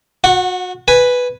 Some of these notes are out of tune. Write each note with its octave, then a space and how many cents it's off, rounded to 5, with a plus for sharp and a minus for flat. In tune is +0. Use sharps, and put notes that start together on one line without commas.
F#4 -30 F#5 +0
B4 +0 G#5 +0